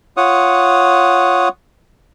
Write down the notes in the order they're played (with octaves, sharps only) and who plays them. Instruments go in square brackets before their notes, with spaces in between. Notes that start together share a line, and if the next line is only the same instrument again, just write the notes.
[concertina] F4 C#5 F#5 D#6